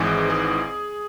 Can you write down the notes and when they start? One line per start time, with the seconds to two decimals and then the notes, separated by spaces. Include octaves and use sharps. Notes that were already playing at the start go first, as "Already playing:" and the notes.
Already playing: G#1 G#2 E3 G#4
0.30 G#4